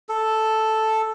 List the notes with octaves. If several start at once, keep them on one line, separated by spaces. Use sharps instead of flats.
A4